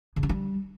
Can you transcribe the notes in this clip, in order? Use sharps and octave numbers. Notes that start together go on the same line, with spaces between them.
C#3
C#4
G3